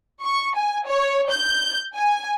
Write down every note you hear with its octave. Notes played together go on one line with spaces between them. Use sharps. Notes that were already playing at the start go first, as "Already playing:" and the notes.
C#6
G#5
C#5
G6
G#5